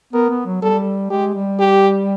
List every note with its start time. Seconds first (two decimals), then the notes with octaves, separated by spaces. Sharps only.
0.13 B3 A#4
0.30 B3
0.46 F#3
0.62 G3 A4
1.10 G#3 G4
1.35 G3
1.59 G4